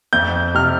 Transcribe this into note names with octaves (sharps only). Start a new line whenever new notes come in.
F2 G6
C3 F6